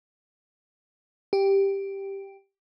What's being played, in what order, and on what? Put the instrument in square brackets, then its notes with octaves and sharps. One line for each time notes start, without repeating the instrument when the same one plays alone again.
[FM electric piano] G4